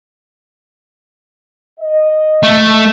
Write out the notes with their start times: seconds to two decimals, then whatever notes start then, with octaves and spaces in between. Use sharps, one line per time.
1.80 D#5
2.43 A3